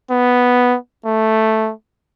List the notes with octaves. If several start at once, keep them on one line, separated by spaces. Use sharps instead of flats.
B3
A3